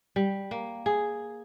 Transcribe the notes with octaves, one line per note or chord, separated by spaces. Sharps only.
G3
A#3
G#4